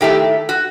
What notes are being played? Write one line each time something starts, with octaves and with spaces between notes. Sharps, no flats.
D#3 A3 E4 G4
F#4